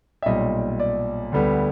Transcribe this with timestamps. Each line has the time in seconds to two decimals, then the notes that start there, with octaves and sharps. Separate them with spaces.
0.22 E5
0.26 B1 A#2 G3 D#5
0.80 D5
1.32 D2 D3 G3 B3